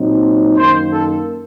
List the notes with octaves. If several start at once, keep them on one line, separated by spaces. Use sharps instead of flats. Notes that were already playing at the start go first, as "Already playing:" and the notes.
Already playing: A#2 F#3 C4 D#4
F#2 D#3 A#3 C5
A4